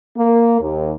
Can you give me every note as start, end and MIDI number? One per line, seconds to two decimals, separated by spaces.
0.17 0.59 58
0.61 0.93 39